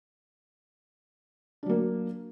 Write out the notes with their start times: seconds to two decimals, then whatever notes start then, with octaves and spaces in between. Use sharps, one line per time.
1.63 D4
1.66 F#3
1.70 A#3